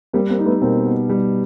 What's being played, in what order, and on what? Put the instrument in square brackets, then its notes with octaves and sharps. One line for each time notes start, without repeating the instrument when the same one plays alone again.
[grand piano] G3 [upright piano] A#3 C4
[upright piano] A#3 C4
[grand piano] D#4
[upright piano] A3 B3
[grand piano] B2 [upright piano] A#3 C4
[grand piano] B3
G3